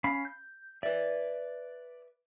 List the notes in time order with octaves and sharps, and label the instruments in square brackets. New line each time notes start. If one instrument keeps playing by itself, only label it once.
[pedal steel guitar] C#4 F5 B5
G6
[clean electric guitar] B4 E5 [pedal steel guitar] D5